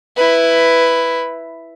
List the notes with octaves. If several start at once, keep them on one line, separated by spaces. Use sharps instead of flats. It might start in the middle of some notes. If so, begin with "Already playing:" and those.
E4 B4